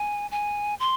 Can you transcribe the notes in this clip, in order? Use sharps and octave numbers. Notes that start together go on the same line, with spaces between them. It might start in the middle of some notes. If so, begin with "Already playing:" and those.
Already playing: G#5
G#5
C6